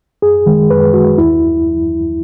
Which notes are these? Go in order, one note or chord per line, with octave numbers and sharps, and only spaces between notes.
F#2 G#4
D#3 G#3
F#2 B4
D#3 G#3 F#4
D#2 E4